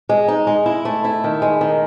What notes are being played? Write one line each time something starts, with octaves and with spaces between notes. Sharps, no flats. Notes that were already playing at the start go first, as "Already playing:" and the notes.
G#3
D#4
G#3
E4
A3
E4
D#3
G#3
D#3